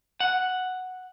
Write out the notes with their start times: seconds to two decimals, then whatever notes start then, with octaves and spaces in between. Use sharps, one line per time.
0.20 F#5